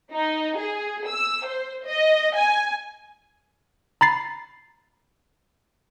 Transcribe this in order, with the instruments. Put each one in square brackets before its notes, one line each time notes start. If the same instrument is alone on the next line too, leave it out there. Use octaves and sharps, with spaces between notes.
[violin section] D#4
G#4
E6
C5
D#5
G#5
[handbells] A#5 B5 A6 C7